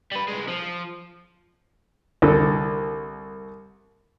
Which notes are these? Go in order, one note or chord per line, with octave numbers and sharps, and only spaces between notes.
G3 B4
C2 G#3
F3
C2 D3 A4